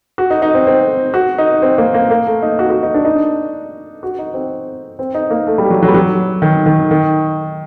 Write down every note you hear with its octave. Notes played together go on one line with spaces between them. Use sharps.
F#4
D#4
D#4
C4
C4
F#4
D#4
C4
A#3
A#3
A#3
A3
D#4
F#4
F#4
D#4
D4
D#4
D4
F#4
D#4
C4
C4
D#4
A#3
A3
G3
F#3
F#3
G3
F#3
D#3
D#3
D#3